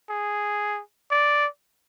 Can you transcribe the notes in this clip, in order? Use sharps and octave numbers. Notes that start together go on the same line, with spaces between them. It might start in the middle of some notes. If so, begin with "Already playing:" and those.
G#4
D5